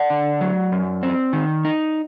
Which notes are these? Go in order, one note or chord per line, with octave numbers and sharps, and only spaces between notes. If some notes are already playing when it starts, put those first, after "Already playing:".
Already playing: D5 F#5
D3
F#3
F#2
C4
D#3
D#4